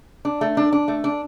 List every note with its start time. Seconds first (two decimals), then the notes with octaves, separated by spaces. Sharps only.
0.25 D4
0.41 A3
0.57 D4
0.72 D4
0.88 A3
1.04 D4